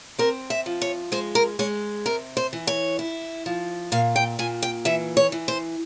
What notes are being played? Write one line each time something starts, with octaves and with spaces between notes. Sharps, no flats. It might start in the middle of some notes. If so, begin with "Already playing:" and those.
C4 A#4
E5
F3
C#5
G#3 C5
A#4
G#3 C#5
C3 A#4
C5
E3
C#5
E4
F3
A#2 F5
G5
A#2 G#5
G5
E3 E5
C#5
E3
C5